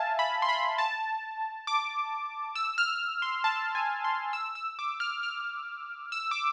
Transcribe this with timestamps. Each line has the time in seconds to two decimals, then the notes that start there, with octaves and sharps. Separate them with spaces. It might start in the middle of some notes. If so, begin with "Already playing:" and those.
Already playing: E5 F5 G#5 A5
0.19 B5
0.42 C6
0.49 B5
0.78 A5
1.67 D6
2.55 E6
2.78 F6
3.22 C6
3.44 A5
3.75 G#5
4.04 C6
4.33 E6
4.55 E6
4.79 D6
5.00 F6
5.23 F6
6.12 E6
6.31 D6